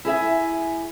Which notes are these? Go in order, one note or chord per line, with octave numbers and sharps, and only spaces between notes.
E4 G#4 E5 G#5